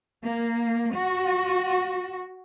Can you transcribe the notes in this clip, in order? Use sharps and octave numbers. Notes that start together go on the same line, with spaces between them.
A#3
F#4